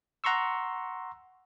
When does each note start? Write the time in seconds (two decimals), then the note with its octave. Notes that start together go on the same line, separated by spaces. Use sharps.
0.24 F#5 A#5 C6 C#6 E6